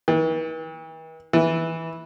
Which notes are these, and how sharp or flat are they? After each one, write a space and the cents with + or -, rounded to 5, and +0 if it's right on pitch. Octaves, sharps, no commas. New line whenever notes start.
E3 -45
E3 -10